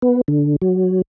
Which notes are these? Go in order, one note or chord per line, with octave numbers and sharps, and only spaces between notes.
B3
D3
F#3